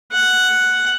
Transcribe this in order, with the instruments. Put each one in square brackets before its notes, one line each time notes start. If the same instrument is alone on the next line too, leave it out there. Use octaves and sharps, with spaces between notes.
[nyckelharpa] F#5